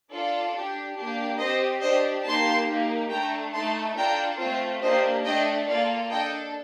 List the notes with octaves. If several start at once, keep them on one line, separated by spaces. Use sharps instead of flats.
D4 F4 A4 D5
D4 G4
A#3 D4 G4
C4 G4 C5 D#5
D4 G4 C5 D#5
A#3 D#4 G4 A5 C6
A#3 D#4 G4
A3 D4 A4 G5 A#5
A3 D#4 A4 A5 C6
D4 F4 A4 G5 A#5
A3 C4 F4 C5
A#3 D4 G4 C5 D#5
A3 D4 A4 D#5 G5
A#3 F4 A4 D5 F5
D4 A4 D#5 G5